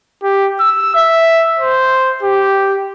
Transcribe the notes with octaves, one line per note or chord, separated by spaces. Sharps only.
G4
E6
E5
C5
G4